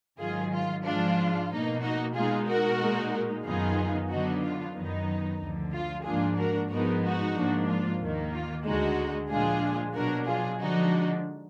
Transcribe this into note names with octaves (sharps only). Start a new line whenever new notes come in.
G#2 D#3 F#3 F4 G#4
F4
G#2 F3 G#3 D4 F4
B2 A#3 D#4
D#4 F#4
B2 G#3 D#4 F4 G#4
F#4 A#4
A#2 G#3 D#4
F#2 D#3 F#3 B3 D#4 F4 G#4
D3 F#3 B3 D4 D#4 F#4
F4
F#2 D#3 F#3 B3 D#4
D2 D3 F3
F4
G#2 F3 A#3 D4 F4 G#4
F#4 A#4
G#2 F3 G#3 B3 D#4 F#4 A#4
D#4 F#4
G#2 F3 A#3 D4
F4
D#2 D#3 A#3
F4
D2 D3 G#3 D#4 F#4
A#2 F3 G#3 D4 F4 G#4
B2 F#3 D4 F#4 A#4
F4 G#4
D3 F3 G#3 D4 D#4 F#4